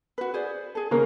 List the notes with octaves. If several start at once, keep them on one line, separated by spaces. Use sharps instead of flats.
F#4 B4
G#4 C5 D5
G#4 A4
C#3 A#3 A#4